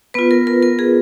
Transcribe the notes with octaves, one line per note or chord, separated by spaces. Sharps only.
B3 F4 B4
A#4
A#4
A#4
G#4